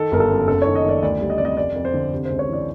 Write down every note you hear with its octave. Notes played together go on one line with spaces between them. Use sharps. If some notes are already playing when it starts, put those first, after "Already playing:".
Already playing: D#3 A4
G1 A#4
A4
F#2
F#1 A4
C#5
D#3
D#5
D#3 D5
D2 D5
G3
D#5
C3 D5
D#5
F2 D5
F2
C5
D3
C3
C5
C#2
C#5
E3
D5